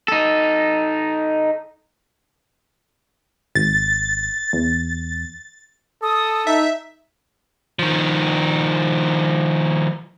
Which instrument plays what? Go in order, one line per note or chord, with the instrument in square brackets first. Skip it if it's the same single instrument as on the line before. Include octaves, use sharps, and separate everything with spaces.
[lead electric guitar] D#4 A4
[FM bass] G#1 [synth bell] A6
[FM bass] E2
[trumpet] A4 [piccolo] D#6
[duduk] D#4 [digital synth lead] E5 [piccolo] E6
[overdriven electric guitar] D#3 F3